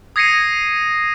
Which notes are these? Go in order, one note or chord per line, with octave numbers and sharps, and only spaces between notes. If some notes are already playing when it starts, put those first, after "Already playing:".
D#6 G#6 A#6 C7 C#7 D#7